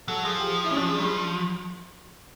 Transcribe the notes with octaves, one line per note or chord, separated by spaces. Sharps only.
F#3 A4
F3 G#4
G4
E4
C#4
D4
G#3
G3